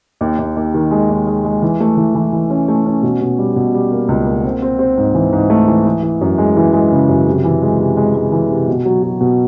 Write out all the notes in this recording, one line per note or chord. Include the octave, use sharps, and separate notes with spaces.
D#2
D#2
D#2
D#3
G#3
D#2
G#3
G#3
E3
A3
E3
E3
E3
C#4
A3
C#4
B2
B2
G3
B2
G3
A#3
C#2
A#3
C4
C4
C4
G#2
E3
G#2
A3
E3
E3
E3
F#2
G#3
E3
G#3
C#3
F#2
C3
E3
G#3
C3
G#3
G#3
E3
C3
B2
F#3
F#3
B2